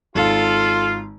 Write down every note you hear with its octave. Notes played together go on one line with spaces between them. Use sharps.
G#1 F4 A4